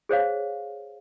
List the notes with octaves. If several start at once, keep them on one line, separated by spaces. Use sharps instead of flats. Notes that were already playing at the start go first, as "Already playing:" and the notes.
G#4 C5 C#5 F5